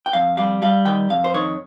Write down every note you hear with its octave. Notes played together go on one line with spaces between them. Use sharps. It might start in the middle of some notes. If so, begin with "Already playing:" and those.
G5
F2 F5
G3 F5
G3 F5
D#3 G5
F2 F5
C5
D#3 C#5